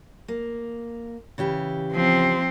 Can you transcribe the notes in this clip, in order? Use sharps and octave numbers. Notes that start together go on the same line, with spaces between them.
A#3
C#3 E3 G4
F3 C4